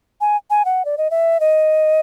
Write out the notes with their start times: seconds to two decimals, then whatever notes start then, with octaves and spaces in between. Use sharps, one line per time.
0.21 G#5
0.50 G#5
0.65 F#5
0.85 D5
0.98 D#5
1.11 E5
1.40 D#5